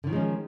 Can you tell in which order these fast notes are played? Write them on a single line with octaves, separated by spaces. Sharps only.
D3 D#3 F3 G#3 C#4